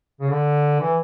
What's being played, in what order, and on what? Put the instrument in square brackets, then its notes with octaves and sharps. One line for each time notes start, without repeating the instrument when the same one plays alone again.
[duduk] C#3
D3
E3